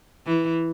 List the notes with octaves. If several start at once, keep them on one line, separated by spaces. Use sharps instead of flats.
E3